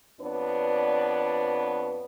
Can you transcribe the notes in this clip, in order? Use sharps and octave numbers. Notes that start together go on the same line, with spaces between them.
F2 B3 D4 B4 C#5 D5